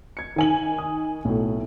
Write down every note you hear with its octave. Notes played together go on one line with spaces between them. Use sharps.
G#6 C#7
D#3 G#5 F#7
D#6
B1 A2 A3